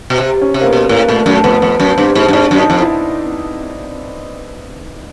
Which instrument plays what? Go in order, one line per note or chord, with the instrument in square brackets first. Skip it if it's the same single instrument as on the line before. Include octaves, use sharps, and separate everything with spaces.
[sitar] B2
C3
[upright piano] C#4
[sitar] C3
[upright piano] A#3
B3
[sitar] B2
[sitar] A2 [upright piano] A#3
[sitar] A#2 [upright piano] A3
[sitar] F#2 [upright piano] A3
[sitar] F2 [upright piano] B3
[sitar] F2 [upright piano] B3
[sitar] F#2
[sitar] G2 [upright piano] C4
[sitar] G#2
G2
[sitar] G#2 [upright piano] D4
[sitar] F#2
[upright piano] D#4
[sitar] F2
[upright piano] E4